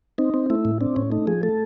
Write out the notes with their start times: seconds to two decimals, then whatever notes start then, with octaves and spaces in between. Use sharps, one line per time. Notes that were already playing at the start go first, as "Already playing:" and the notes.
0.18 C4 D#4
0.34 C4
0.50 A3 E4
0.65 A2
0.81 C4 D4
0.96 A2 C#4
1.12 A3 D#4
1.27 F3 G#4
1.43 A3 A4